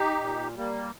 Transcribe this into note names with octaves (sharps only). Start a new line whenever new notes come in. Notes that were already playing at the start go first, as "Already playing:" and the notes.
Already playing: D#4 G4
A#2
G3 A#3